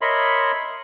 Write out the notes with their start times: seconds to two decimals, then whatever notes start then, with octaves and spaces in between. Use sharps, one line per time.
0.01 A#4 C#5 D#5 E5 B5 C6